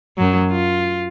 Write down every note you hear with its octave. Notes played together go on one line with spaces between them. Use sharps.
F#2 F#3
F4